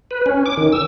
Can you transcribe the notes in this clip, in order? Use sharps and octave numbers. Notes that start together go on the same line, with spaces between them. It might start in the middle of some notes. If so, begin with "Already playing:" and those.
B4
C#4
D6
D#3
E6